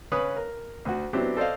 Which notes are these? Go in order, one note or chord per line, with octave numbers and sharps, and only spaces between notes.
C#3 C#4 B4 C#5 D#6 F#6
A#4
D2 F#4
F#3 B3 C4 D4 E4 G4
A4 C5 D5 D#5 F5